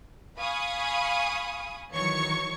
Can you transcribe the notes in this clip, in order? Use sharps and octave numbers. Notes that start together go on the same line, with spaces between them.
F5 G#5 B5 C#6 D#6
D#3 E3 F#3 C#5 C#6 C#7